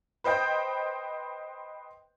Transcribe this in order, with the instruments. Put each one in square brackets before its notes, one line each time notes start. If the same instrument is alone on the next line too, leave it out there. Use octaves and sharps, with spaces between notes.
[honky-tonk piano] B4 C5 D#5 G5 G6